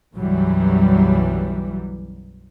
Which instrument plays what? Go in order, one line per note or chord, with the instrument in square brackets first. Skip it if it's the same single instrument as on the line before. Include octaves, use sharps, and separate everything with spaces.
[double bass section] B1 F#2 E3 F#3 G3